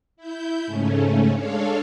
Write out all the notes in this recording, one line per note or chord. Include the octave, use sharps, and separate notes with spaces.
E4 G6
G#2 C#3 A3 C#4
G#3 D4 A4 C#5 F5